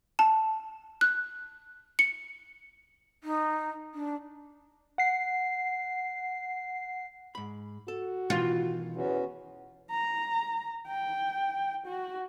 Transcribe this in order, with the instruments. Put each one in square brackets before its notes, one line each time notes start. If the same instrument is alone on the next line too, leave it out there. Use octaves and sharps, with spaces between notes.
[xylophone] A5
F#6
C#7
[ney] D#4
D4
[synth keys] F#5 C7
[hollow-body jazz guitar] G#2 B5
[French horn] F#4 [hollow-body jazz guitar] A4
[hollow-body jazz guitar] B2 D#3 E3 [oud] F4
[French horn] E2 [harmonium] B3 C#4 F#4
[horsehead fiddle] A#5
G5
F#4